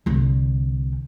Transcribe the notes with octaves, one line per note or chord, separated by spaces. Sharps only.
C2 D3